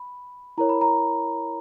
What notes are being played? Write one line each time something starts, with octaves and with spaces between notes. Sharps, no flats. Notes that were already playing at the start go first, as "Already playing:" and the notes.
Already playing: B5
E4 A#4 C#5 A#5
B5
A#5